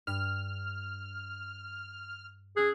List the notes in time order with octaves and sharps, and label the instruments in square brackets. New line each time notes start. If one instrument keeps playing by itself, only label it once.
[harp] G2 [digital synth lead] F6
[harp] C#4 E6 F#6 [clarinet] G#4